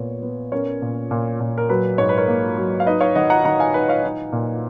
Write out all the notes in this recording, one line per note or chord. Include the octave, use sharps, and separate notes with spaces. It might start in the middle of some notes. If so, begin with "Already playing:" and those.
Already playing: A#2 B3 C#5
B3
C#4 A#4 C#5
A#2
A#2
A#2
A#4
F#3 B4
G#2 C#5
B4
A#4 C#5
A#3
F#3
F5
D#4 B4 D#5
C#5 F5
D#3 D#5 F#5
F#5 A#5
D#3 F#5 A#5
F5 G#5
D#4 B4 D#5
C#5 F5
D#4
A#2